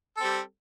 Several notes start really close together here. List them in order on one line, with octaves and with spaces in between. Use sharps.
A4 C4 G3